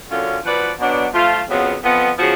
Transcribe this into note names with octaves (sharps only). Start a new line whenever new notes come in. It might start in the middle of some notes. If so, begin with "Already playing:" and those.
F#2 D3 F#3 C#4 F4
F3 B3 F#4 B4 D5
B2 F#3 B3 D4
F3 A3 F4
F2 C#3 F#3 B3 F4
F2 F3 B3
C#3 F3 B3 F#4